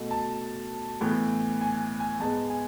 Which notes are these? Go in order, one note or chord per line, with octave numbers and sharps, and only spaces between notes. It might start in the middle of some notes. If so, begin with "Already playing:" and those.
Already playing: B2 A3
A5
A2 E3 B3
G#5
G#5
G#2 G#3 B3 A5
G#5